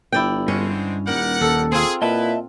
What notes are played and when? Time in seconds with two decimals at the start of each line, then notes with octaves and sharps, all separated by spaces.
0.13 G1 E4 D5 G5
0.48 G2 D3 G#3 C4 C#4
1.07 D#1 G3 A#4 F#5
1.41 D#2 A4
1.72 C4 F4 G#4
2.02 A#2 E4 B4 D#5 E5 A5